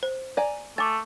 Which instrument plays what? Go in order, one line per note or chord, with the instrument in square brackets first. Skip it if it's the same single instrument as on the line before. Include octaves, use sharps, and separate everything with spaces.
[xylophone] C5
[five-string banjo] D5 G#5 A#5
[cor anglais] A3 [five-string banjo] G#5 [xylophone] D6 A6